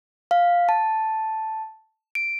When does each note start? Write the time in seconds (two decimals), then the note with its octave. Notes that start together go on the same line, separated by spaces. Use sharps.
0.31 F5
0.69 A5
2.15 D7